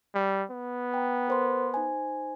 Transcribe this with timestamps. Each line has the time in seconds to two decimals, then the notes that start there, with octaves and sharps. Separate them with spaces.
0.15 G3
0.51 B3
0.94 G5 A#5
1.28 A#4 C5 C6
1.74 D#4 C5 G#5